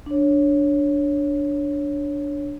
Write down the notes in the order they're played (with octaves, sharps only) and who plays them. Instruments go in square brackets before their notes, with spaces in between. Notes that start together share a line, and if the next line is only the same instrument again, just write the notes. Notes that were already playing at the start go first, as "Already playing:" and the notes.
[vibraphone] D4 C#5